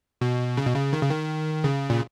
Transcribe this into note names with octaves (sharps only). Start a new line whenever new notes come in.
B2
C#3
B2
C#3
D#3
C#3
D#3
C#3
A#2